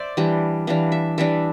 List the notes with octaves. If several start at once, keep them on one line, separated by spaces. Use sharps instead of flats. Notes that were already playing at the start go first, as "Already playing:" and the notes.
Already playing: C5 D5 E5
E3 G3 D4
E3 G3 D4 F5
E5
E3 G3 D4 E5